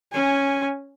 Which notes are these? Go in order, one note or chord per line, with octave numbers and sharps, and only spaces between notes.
C#4 G#5